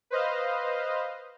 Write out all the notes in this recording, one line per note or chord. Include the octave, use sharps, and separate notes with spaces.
B4 C5 D#5 F5